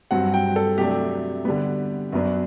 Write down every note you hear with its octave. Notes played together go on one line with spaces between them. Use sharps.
G2 F#3 C4 F#5
G5
A4
C3 F#3 A3 D4 G4
D3 G3 B3
F#2 F#3 B3 D4